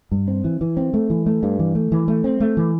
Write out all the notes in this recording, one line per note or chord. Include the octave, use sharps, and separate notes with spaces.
G2
C4
E3
E3
C4
A3
E3
A3
G2
E3
A3
E3
A3
C4
A3
E3